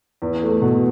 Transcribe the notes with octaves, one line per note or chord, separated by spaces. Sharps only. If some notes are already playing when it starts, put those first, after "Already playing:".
E2
A3
B2